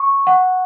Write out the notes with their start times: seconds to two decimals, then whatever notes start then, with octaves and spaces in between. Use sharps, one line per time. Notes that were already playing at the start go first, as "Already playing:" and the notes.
Already playing: C#6
0.27 F#5